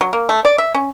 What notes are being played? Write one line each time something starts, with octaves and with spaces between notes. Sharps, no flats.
F#3
A#3
A3
D5
E5
C#4